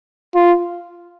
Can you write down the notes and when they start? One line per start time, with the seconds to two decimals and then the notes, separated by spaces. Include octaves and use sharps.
0.35 F4